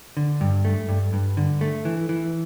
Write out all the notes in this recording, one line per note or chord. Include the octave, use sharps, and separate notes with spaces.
D3
G2
A3
G2
G2
D3
A3
E3
E3